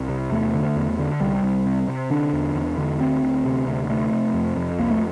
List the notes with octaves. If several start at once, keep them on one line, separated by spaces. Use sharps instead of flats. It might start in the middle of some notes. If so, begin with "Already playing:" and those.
Already playing: C2
C3
E2 A3
D3
E2
D3
C2 G3
C2
C3
C3
D3 D4
E2
E2
D3
D2 C4
D2
C3
D2
C3 A3
C3
F2
F2
C2 A#3
A3